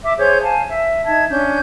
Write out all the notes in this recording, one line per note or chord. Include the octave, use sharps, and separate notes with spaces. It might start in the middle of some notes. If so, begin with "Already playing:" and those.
E5 D6
G#4 C5 C#5 G6
F5 G#5 A5
E5
D#4 E5 A5 G#6
C#4 D4 G6